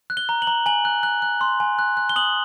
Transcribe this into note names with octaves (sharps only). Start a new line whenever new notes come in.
F#6
G7
A#5
F#7
A#5
G#5 F#7
F#6
F#6
F#6
C6
G#5
F#6
F#6
G7
D#6 F#7